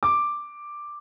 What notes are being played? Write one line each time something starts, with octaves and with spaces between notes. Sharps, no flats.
D6